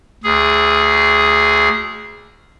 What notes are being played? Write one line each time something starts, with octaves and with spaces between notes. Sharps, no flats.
D2 G#4